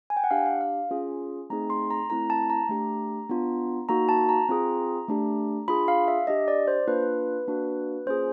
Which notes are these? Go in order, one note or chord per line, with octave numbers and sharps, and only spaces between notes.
G#5
G5
F#5
D4 G4 F5
F5
F5
C#4 F4 G#4
A3 C4 D#4 G#4 A#5
C6
A#5
A3 C4 E4 A4 A#5
A5
A#5
A3 D4 G4
B3 D4 F4
A#3 D#4 F#4 A#5
A5
A#5
C4 F4 G#4
A3 D4 G4
D4 F4 G#4 B5
F5
E5
D4 G4 D#5
D5
C5
A#3 D4 F4 B4
A#3 D4 F#4
A#3 C#4 F4 G#4 C5